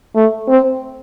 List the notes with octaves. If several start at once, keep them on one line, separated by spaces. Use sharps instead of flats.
A3
C4